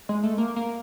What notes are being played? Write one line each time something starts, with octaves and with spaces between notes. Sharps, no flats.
G#3
A3
A#3
A#3